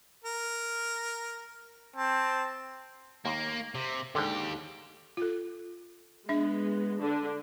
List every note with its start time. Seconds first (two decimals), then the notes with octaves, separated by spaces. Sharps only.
0.24 A#4
1.96 C4 A5
3.25 D#2 A#3
3.75 C3
4.15 D#2 G#2 D3 G4
5.17 F4 A4
6.29 G#3 B3 D4 E5
7.00 D3 D4